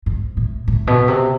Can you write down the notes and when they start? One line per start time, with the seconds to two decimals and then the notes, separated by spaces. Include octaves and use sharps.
0.06 G#2
0.37 A2
0.68 A2
0.87 B2
1.08 C3